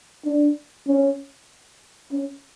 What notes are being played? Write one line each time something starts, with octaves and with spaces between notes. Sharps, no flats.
D4
C#4
C#4